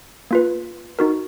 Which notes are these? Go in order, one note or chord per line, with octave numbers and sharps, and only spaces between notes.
A#3 F4 B4
D#4 F#4 A#4